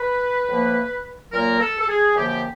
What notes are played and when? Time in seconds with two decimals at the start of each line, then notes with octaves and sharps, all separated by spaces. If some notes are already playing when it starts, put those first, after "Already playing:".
Already playing: B4
0.48 A2 F3 A#3
1.32 A#2 F#3 A#3 A#4
1.60 A4
1.79 A4
1.88 G#4
2.16 F#2 D3 F3 A#3 G4